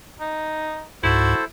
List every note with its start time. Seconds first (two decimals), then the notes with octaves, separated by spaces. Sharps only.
0.20 D#4
1.03 C#2 G#2 E4 F#4 A4 C5